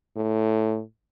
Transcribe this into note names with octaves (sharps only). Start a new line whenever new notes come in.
A2